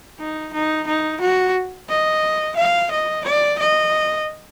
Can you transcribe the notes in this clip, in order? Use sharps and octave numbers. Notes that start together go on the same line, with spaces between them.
D#4
D#4
D#4
F#4
D#5
F5
D#5
D5
D#5